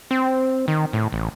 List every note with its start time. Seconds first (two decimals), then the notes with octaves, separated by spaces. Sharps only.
0.11 C4
0.68 D#3
0.93 A2
1.13 A1